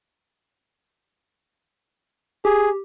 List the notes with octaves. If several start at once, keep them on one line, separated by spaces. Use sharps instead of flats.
G4 G#4